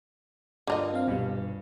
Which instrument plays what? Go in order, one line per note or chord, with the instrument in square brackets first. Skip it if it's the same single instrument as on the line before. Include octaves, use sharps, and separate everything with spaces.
[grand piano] G2 F4 A#4 [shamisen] D3 D#4 D#5
[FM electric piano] C4 F5
[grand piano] D#1 G2 B3 [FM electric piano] B2 G3